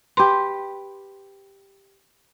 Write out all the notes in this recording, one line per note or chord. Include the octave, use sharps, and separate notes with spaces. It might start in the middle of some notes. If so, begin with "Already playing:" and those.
G4 B4 C6